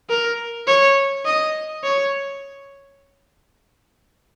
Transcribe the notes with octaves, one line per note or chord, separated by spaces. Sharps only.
A#4
C#5
D#5
C#5